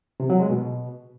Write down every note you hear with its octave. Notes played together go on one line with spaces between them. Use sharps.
C3
F#3
G#3
B2